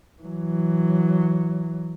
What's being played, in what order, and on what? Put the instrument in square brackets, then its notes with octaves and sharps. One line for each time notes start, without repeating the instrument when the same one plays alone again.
[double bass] E3 F#3